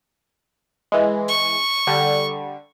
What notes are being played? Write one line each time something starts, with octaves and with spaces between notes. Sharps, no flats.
E3 G#3
C#6
D3 G3